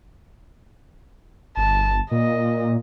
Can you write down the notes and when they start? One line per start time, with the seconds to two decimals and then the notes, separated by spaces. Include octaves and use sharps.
1.57 G1 A5
2.11 A#2 D#5